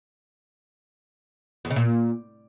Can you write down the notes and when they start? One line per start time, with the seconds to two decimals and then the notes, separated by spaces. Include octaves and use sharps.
1.65 E2
1.71 C#3
1.76 A#2